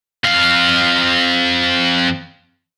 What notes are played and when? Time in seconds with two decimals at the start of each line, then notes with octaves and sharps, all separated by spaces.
0.25 F2 F5